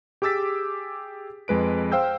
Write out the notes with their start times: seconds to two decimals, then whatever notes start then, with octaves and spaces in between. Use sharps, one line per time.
0.22 G4 G#4 D6 E6 A6 B6
1.48 F2 G#3 B4 D7
1.92 C5 F5 G5 E6 G6